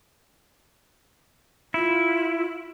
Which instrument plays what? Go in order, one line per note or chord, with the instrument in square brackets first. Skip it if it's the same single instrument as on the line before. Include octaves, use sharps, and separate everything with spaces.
[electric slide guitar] E4 [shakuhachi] F4